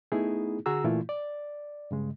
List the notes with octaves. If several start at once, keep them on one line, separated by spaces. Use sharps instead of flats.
A3 B3 D#4 E4 G#4
D3 F#4 G#4 A#5 E6
A#2 E3 A3 E4 F4
D5
G2 C#3 G#3